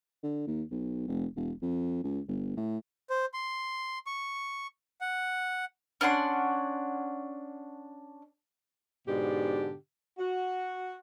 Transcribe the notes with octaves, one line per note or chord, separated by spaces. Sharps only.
D3
D#2
B1
F1
E1
F2
C#2
G1
A2
C5
C6
C#6
F#5
C#4 D4 F#5 C6
G#2 B2 D3 D4 G4
F#4